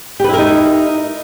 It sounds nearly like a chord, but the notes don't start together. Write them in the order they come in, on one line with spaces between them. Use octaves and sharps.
G4 B4 E4 A#4 D#4